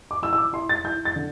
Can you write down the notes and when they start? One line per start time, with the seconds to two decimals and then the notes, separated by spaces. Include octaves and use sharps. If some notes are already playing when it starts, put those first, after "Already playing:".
0.11 D6
0.22 E4 E6
0.33 E6
0.38 D6
0.53 E4 C6
0.69 A6
0.84 E4 G6
1.05 A6
1.16 D3